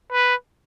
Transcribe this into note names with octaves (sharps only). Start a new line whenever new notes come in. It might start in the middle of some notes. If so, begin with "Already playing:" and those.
B4